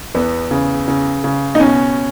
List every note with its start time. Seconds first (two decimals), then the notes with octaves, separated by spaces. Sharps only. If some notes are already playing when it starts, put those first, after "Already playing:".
0.15 E2 B3
0.51 C#3
0.88 C#3
1.24 C#3
1.55 D#4
1.60 B2 C#4